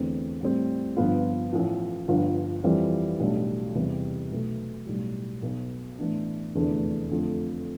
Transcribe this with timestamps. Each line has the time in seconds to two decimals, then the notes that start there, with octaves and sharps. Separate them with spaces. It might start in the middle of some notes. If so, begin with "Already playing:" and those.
Already playing: E2 D3 A3 C4
0.41 A2 G3 C4
0.97 G1 G2 F3 B3 F4
1.53 A1 A2 F3
2.08 G1 G2 F3
2.64 F2 E3 G3 C4
3.19 B1 A2 G3 D4
3.75 E2 C3 G3
4.31 B1 B2 A3
4.87 B1 A2 G3
5.42 B1 B2 B3
5.98 A2 E3 B3 D4
6.54 F1 E2 D3 A3 D4
7.10 F2 D3 A3